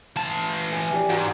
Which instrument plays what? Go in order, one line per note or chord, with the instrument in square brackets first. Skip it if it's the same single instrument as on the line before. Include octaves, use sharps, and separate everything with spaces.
[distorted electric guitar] E3 A5
[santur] G#5
G4 D5
[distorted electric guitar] G#2 [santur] F#4 A#5 D#6